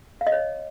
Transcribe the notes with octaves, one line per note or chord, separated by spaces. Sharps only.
F5
D#5
C#5